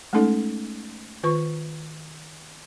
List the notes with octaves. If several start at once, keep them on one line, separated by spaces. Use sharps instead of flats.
G#3 A3 C#4 D#4 A4
D#3 F4 B4 C#6